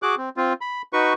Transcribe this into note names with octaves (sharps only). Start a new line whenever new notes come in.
F#4 G#4 D6 F#6
C4
C4 F4
B5
D#4 F#4 B4 C#6